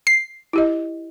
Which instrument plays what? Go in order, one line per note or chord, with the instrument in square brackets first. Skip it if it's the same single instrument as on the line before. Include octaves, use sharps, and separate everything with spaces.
[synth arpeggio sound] C7
[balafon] E4 G4 D#5